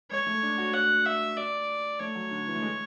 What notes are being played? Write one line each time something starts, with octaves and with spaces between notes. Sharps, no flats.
G#3 C#5
A3
D4
F#4
F#5
E5
D5
A3 C#5
F#3
D3
E3
A3
G#3